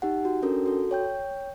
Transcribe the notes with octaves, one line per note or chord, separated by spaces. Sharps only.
D#4 G4 F#5
F#4
C#4 D4 F#4 A4 A#4
F#4 A4
C#5 G5 G6